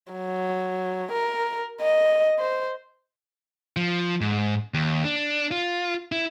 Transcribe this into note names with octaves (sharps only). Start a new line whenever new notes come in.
F#3
A#4
D#5
C5
F3
G#2
D#2
D4
F4
E4